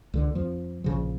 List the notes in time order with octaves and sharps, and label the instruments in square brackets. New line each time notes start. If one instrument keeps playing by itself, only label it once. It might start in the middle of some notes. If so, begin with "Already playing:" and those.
[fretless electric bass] C#2 D3
F2 F3
A#1 C#3 F3